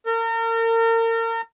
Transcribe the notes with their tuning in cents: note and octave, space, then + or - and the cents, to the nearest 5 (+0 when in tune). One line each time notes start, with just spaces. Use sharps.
A#4 -35